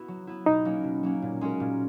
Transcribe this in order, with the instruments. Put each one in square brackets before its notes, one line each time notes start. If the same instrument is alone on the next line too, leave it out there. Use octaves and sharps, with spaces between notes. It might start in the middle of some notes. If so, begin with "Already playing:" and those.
Already playing: [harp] B3 E4 F#4 B4
F#3
B3 E4
[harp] B2 [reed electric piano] D#4
[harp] F#3 A#3 C#4
B2
F#3 A#3 C#4
A#2
G#3 C#4 F#4 A#4
A#2